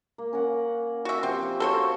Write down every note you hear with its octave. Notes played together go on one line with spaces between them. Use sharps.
A#3
C#4 A#4 F#5
F#4 E5
F3 C4 G4 E5
F#4 A4 C5 C#5